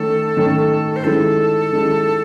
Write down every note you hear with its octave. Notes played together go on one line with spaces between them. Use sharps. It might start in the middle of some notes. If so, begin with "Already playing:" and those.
Already playing: D#3 A3 C#4 A4
D#3 A3 C#4
C5
D#3 G#3 C#4 E4 A4
D#3 G#3 C#4 E4